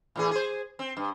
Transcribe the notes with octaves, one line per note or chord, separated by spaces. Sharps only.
A2 E3 G#4
G#4 C5
C4
G2